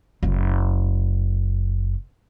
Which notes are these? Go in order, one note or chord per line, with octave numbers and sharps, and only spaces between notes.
F#1 A3